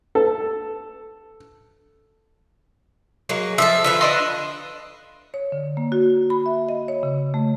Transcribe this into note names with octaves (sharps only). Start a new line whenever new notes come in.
A4
F#3 G#3 A#3
F3 A4 E5 A5
D3 F4 B4 E5
D4 D#5 C6
C#5
D3
A#3
F#4
B5
E5
D#5
C#5
C#3
A3